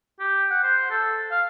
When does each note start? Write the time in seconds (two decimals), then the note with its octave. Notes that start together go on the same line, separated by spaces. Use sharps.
0.20 G4
0.51 F#5
0.63 C5
0.90 A4
1.31 F5